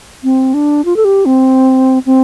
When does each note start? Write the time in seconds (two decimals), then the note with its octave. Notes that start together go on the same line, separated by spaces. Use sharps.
0.24 C4
0.54 D4
0.85 F4
0.96 A4
1.05 G4
1.26 C4
2.06 C4